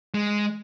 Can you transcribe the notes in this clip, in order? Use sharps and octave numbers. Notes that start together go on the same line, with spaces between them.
G#3